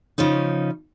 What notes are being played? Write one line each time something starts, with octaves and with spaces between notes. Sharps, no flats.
C#3 F3 C#4 D#4